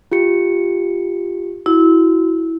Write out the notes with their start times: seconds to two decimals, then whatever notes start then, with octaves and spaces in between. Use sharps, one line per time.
0.12 F4 G4 C#7
1.66 E4 F#4